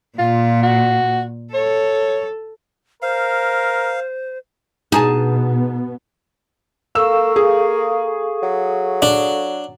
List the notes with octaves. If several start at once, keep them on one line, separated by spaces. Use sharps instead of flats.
A#2 F4
F#4
A4 C#5
A#4 C5 F5
B2 B3 D#4 G#4 A5
A#3 A4 F5 C#6 E6
G#4
F#3
D4